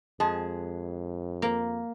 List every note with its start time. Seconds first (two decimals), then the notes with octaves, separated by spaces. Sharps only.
0.20 F2 G#3 G#4 A5
1.42 A#3